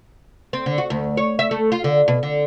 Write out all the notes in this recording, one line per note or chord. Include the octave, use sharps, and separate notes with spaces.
C4
D3
F#4
D2
C#5
E5
A3
F4
D3
B2
D3